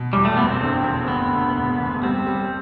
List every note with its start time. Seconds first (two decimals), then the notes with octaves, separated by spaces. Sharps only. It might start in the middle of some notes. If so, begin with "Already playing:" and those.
Already playing: B2
0.13 E2 G3
0.25 A3
0.37 F#1 B3
0.49 C4
0.61 D3
0.84 F#1
1.08 D2 B3
1.32 D3
1.56 E1
1.80 D2
2.03 G3 C4
2.27 G3